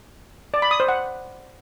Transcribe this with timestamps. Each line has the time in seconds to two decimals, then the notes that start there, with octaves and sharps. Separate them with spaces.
0.54 D5
0.62 B5
0.71 D#6
0.80 C5
0.88 F#5